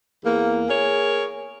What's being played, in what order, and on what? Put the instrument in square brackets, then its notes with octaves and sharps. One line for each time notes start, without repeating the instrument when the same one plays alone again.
[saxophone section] E2 A#3
G#4 A#4 C#5